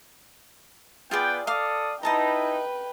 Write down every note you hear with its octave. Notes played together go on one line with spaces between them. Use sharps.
B3 F4 G#4 B4 D5 G5
A4 D5 F5 D6 D#6
D#4 E4 B4 D#5 G5 A5 A#5